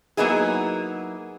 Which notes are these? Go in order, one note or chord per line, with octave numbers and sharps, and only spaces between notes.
F#3 A#3 B3 D#4 E4 G#4